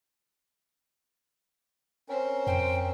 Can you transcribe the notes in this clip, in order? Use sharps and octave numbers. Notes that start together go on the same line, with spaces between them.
C4 C#4 A#4 C5
F2 G5